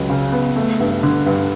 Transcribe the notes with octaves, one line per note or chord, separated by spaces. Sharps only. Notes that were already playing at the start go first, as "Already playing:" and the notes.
Already playing: C#2 F#3
C#3
B3
A3
G2
D3
G2